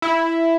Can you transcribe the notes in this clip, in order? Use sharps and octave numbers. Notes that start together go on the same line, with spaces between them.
E4